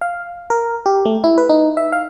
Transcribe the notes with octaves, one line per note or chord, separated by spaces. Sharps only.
F5
A#4
G4
A3
E4
B4
D#4
E5
F5